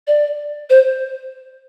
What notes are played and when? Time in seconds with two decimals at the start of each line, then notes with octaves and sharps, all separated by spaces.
0.07 D5
0.70 C5